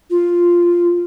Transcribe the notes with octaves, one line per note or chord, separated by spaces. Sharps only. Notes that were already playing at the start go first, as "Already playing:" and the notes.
F4